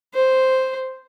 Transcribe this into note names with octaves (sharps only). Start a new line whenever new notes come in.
C5